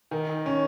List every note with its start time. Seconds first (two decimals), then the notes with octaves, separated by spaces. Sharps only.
0.11 D#3
0.46 C#4